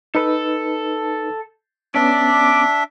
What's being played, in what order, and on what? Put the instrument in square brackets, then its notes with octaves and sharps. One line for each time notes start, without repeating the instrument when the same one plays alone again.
[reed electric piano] D#4 B4 [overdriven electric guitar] A4
[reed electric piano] B3 C#4 [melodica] D4 E5 [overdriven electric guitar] D5